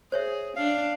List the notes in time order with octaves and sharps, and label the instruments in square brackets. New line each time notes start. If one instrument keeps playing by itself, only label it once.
[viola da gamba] G#4 [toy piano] C5 C#5 E5
[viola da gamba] D4 [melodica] F5